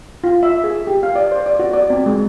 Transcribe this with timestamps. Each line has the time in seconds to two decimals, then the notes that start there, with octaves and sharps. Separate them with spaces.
0.24 F4
0.43 E5
0.64 G#4
0.87 G4
1.03 F5
1.16 D5
1.31 C5
1.46 D5
1.59 F#4
1.73 D5
1.90 C4
2.06 G#3